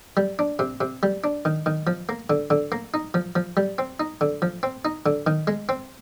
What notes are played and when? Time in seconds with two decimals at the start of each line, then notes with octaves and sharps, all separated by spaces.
0.17 G3
0.39 D4
0.59 C3
0.81 C3
1.03 G3
1.24 D4
1.45 D#3
1.66 D#3
1.87 F3
2.09 A#3
2.30 D3
2.50 D3
2.72 A#3
2.94 D#4
3.14 F3
3.35 F3
3.57 G3
3.78 C4
4.00 D#4
4.21 D3
4.42 F3
4.63 C4
4.85 D#4
5.06 D3
5.27 D#3
5.47 G#3
5.69 C4